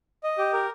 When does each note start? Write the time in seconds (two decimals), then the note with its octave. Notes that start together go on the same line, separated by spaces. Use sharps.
0.24 D#5
0.38 G4
0.53 A#4